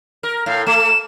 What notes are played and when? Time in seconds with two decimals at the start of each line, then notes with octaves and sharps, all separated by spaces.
0.23 A#4
0.46 A2 F5
0.67 A3 E7